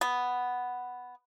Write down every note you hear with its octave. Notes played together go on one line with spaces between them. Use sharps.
B3